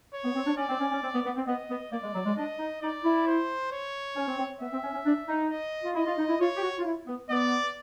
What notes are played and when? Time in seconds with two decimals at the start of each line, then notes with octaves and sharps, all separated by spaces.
0.13 C#5
0.24 B3
0.35 C4
0.46 D4
0.57 C#4 D5
0.69 C4
0.80 C#4
0.91 C#4
1.02 C4
1.14 B3
1.25 B3
1.36 C4
1.47 B3 D#5
1.70 B3
1.92 A#3 D5
2.03 G#3
2.14 F#3
2.26 G#3
2.36 D4 D#5
2.59 D#4
2.82 D#4 D5
3.04 E4
3.27 C5
3.72 C#5
4.16 C#4
4.27 C4
4.38 C4
4.60 B3 E5
4.72 C4
4.83 C#4
4.94 C#4
5.06 D4
5.28 D#4
5.50 D#5
5.84 F4
5.95 E4 D#5
6.06 F4
6.17 D#4
6.28 E4
6.40 F4 C#5
6.56 G4
6.62 F#4
6.79 F4
6.85 E4
7.07 B3
7.29 B3 D5